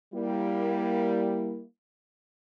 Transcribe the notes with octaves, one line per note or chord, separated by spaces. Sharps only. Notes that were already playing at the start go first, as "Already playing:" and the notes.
G3 A#3 E4